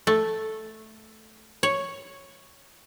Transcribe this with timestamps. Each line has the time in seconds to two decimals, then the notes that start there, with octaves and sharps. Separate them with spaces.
0.07 A3
1.63 C#5